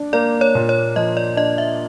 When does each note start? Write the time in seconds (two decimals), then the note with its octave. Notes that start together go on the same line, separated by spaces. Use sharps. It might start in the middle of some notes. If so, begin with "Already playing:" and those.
Already playing: D4
0.13 A#3 D5
0.41 C#5
0.55 A#2
0.69 C#5
0.96 F3 D#5
1.17 D5
1.37 D4 D#5
1.58 E5